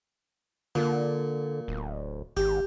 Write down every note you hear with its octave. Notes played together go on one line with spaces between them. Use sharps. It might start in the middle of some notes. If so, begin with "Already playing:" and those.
A#2 D3
D1
G#1 G4